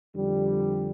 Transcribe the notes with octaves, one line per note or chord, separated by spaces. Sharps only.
F2 D3 G3